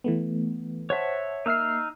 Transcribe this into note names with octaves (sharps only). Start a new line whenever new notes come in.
E3 A3 B3
C5 C#5 E5 F#5 A5
A#3 D#4 E5 E6 F6 C7